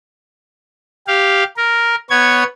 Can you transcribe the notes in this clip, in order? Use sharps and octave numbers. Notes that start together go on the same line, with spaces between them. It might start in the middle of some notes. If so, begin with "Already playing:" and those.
G4 F5
A#4
B3 C#5 G#6